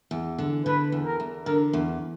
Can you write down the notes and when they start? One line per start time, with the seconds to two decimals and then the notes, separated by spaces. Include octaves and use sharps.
0.11 E2
0.39 D3
0.65 D3 B4
0.92 E2
1.05 A#4
1.20 E2
1.46 D3 A#4
1.73 E2